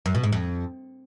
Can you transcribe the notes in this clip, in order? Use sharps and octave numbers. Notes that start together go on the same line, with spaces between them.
F#2
B2
G#2
F2